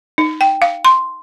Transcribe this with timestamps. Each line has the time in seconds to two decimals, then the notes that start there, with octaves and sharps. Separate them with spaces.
0.18 D#4
0.41 G5
0.62 F5
0.85 C6